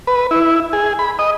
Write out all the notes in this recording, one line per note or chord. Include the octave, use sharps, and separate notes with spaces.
B4
E4
G#4
B5
D#5